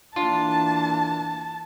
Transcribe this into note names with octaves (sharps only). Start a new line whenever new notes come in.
E3 A#3 D4 F4 A5